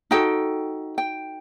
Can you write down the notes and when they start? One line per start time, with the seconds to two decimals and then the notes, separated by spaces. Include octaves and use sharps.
0.11 D#4 F#4 A4 G5
0.98 G5